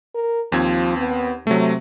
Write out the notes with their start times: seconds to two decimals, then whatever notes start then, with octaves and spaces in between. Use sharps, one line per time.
0.15 A#4
0.52 D#2 F3 C4 G#6
0.97 B3
1.47 C3 F#3 A3